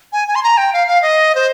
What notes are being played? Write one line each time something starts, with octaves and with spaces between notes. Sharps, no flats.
G#5
G#5
C6
A#5
G5
F5
F5
D#5
C5